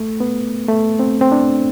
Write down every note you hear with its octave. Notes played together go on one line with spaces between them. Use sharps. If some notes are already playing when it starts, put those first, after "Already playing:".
Already playing: A3
B3
A3
C4
C4
D4